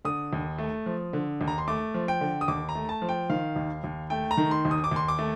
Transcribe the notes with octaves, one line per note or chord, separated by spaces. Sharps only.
D3 D#6
D#2
A3
F3
D3
D#2
A#5
C6
A3 D6
F3
G5
D3
D#6
D#2 D6
A#5
A3
A5
F3
G5
D#3 F5
D#2
D#2
A3 G5
A#5
D#3
C6
D#2
D#6
D6
D#2 C6
D6
A3